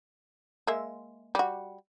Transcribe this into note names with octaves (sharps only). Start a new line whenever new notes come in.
G#3 A#3 E5
G3 F#4